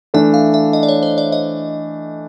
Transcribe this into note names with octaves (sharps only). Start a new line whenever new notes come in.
E3 A3 D4 E5
F5
E5
D#5
D5
C#5
C5
D5
D#5